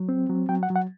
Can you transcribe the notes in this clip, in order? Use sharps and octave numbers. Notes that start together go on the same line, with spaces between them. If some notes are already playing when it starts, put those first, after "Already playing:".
Already playing: F#3
C4
F#3
F#3 G5
F#5
F#3
F#5